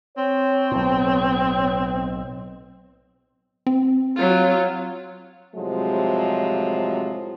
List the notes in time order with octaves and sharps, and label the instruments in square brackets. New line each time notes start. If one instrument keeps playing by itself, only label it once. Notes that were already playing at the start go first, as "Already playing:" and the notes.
[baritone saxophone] C4 [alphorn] C#5
[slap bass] B1 A2
[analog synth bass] C4
[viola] F#3 F4
[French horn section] A2 C3 F3 F#3 G#3